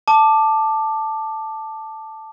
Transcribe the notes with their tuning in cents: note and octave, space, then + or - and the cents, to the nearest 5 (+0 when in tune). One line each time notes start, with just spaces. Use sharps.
A5 +0 D6 +15